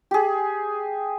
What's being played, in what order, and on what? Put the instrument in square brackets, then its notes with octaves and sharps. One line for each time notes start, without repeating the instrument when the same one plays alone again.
[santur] G4 G#4